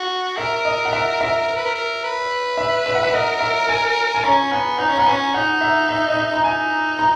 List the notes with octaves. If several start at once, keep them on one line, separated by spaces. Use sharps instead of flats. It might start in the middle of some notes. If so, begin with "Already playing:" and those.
Already playing: F#4
A#4 E5
D#5
F#5
E5
E5
A#4
B4
A#4
A#4
B4
E5
E5
F#5
E5
A#4 D#5
E5
G#5
G#5
C#4 A#5
B3 G#5
D#4 A#5
C#4
B3 A#5
C#4 G#5
D#4 F#5
E5
E5
D#5
E5
A#5
D#4 G#5
A#5